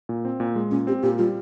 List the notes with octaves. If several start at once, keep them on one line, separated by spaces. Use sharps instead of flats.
A#2
C4
A#2
G#3
A#2 C#4
C4 G4
A#2 G4
G3 F4